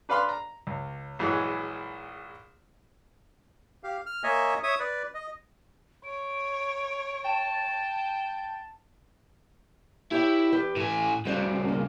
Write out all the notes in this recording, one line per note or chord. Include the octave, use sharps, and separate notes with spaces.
D4 B4 D5 F5 B5 C6
A#5
C#2
A#1 E3 F#3 G#3
G4 F5
F6
A#3 C#5 D#5 E5 G#5
C#5 E5 D#6
B4 D5
D#5
C#5 D7
G5 A5 E7
E4 G4 C#5 G5
E2 G4 B4
A2 E3 G#5
C2 C#3 F#4 C5 D5
A#3